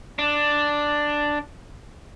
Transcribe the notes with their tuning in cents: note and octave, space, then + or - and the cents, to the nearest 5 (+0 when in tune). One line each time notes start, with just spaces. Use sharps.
D4 +5